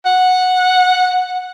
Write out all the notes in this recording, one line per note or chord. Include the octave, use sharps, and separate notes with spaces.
F#5